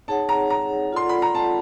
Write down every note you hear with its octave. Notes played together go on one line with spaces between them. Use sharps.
D#4 G#4 C#5 F#5 A5
A#5
A#5
F4 A4 D5 F#5 C6
B5
A#5
A5